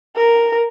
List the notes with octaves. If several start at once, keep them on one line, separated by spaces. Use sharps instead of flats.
A#4